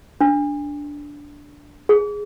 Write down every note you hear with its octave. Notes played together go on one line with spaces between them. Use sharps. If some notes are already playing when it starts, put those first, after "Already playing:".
D4
G#4